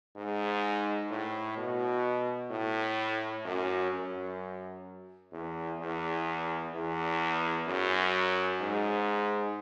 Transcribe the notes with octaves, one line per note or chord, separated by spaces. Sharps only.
G#2
A2
B2
A2
F#2
F#2
E2
E2
E2
F#2
G#2